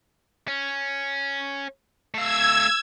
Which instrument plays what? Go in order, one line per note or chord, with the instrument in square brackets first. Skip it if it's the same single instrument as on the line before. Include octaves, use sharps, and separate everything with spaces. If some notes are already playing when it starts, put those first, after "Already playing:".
[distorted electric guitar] C#4
[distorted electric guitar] A3 F5 [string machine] E6 G#6